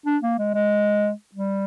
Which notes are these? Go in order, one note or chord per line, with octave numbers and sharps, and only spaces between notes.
D4
A#3
G#3
G#3
G3